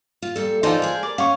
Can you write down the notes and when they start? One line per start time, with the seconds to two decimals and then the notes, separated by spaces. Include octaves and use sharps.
0.22 F4
0.36 A#2 G3 A4
0.63 E3 D#4 F4 A4 C5 D5
0.82 G#4 A#4
1.03 D5
1.18 C#4 F5 C#6